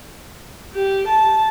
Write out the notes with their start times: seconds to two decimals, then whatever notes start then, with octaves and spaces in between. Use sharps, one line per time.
0.74 G4
1.07 A5